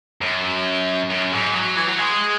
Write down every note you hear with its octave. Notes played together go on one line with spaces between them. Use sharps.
F#2
F#2
G#2
F#3
E3
F#3
G#3